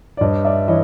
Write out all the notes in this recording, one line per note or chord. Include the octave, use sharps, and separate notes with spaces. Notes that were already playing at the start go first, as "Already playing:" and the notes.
D5
G2 C#5 D#5
D5 E5
E3 C#5 D#5